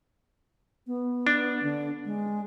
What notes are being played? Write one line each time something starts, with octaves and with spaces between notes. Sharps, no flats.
B3
D4
D3
G#3